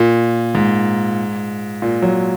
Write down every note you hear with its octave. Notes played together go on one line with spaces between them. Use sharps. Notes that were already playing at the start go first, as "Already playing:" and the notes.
Already playing: A#2
G#2
A#2
F#3